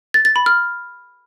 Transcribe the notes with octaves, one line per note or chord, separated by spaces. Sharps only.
A6
A6
B5
F6